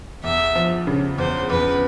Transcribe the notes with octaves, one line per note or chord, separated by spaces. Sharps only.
E2 E5
F3
C#3
E2 C5
E2 B4